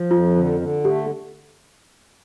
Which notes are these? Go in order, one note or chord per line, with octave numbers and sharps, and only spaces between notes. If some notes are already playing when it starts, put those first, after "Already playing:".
Already playing: F3
F2 F4
D3
D3
A3 G4